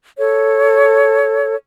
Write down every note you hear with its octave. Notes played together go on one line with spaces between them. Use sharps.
A4 C#5